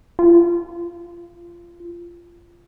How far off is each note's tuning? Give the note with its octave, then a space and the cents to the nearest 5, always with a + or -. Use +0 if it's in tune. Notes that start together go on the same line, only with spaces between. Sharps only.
F4 -20